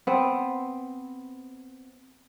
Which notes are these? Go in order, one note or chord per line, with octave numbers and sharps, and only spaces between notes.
B3 C4